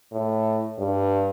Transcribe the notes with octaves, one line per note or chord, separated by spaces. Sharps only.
A2
G2